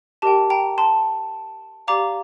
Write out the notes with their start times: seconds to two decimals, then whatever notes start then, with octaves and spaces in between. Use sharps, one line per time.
0.22 G4 A#4 D#5 G5 A5
0.50 G5 A#5
0.78 A5 C6
1.88 G4 D5 F5 A#5 D6